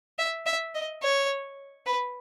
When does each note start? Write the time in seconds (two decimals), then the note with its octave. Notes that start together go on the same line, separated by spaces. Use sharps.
0.19 E5
0.46 E5
0.75 D#5
1.03 C#5
1.86 B4